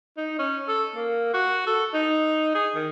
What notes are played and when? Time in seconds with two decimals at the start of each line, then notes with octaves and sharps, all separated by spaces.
0.17 D#4
0.39 C#4
0.69 A4
0.96 A#3
1.34 F#4
1.67 A4
1.94 D#4
2.55 G#4
2.75 D#3